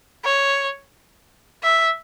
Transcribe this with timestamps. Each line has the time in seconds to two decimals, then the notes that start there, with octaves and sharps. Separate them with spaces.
0.24 C#5
1.63 E5